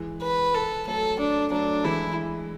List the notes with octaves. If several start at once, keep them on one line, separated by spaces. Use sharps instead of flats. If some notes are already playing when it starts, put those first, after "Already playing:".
Already playing: E3 G#3
B4
A4
F#3 A3 A4
D4
F#3 A3 D4
E3 G#3 E4